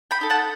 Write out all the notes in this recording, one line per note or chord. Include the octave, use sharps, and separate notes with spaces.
G5 B5
D#4 A4
F#5 A5